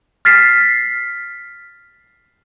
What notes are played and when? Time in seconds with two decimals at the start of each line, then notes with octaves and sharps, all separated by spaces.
0.25 F6 A6 B6 C7